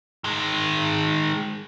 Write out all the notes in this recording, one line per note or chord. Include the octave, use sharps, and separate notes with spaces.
D#3 G#3